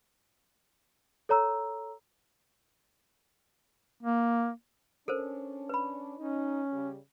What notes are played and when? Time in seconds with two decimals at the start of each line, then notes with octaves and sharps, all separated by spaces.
1.29 A4 C#5 A#5 E6
4.03 A#3
5.08 C#4 D4 A4 A#4 C5
5.69 B4 B5
6.18 C#4 D#4
6.73 C#3 G3